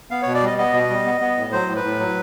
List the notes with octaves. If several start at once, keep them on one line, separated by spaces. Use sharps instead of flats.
B3 F5
B2 C#5
D5
G3 D#5
B3 D#5
B2
G3
B3
B3
A2
F#3 C5
A2
B4
A2
F#3